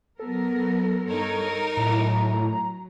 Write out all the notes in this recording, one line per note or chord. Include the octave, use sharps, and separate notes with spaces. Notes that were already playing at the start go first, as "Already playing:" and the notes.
F#3 B3 A4 A#4
G2 D#4 A#4 C#5
A2 F#3 A#5